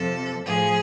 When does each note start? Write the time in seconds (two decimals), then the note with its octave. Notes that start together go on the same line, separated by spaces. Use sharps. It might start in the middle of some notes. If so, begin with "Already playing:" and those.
Already playing: F2 C3 F3 A4
0.44 A2 F3 G#4